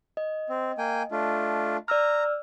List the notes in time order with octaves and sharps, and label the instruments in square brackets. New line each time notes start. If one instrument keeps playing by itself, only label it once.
[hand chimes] D#5
[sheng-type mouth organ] C4
A#3 G5 G#5
A3 D4 F4
[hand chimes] D5 E6 F6 [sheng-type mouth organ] A#5